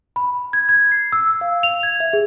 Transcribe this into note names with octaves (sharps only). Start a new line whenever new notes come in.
B5
G#6
G#6
C7
E6
F5
F7
G#6
E5
G#4